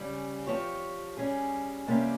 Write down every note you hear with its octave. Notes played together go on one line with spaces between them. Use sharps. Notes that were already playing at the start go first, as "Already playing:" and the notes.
Already playing: C#3 G3 C#4
F3 C4 G4 C#5
G3 C#4 G#4
C3 G3 A#3 C#4 G4